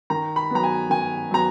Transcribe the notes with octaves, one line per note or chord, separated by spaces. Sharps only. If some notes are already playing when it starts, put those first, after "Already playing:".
D#3 A#5
B5
F#3 B3 A#5
G#5
D#3 G#5
F#3 B3 A#5